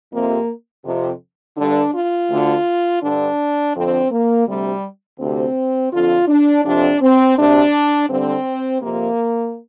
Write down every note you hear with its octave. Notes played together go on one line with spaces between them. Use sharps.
F2 C3 A#3
F2 C3
G2 D3 D4
F4
D2 D3
G2 D3 D4
F2 D3 C4
A#3
D2 C3 G3
D2 C3 C4
F2 D3 F4
D4
F2 C3 D4
C4
D2 C3 D4
G2 D3 C4
F2 C3 A#3